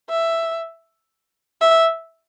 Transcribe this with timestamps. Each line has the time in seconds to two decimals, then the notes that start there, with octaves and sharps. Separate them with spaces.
0.09 E5
1.61 E5